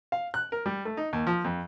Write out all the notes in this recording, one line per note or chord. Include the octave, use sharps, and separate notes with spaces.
F5
F#6
A#4
G3
A3
D#4
D#2
F3
F2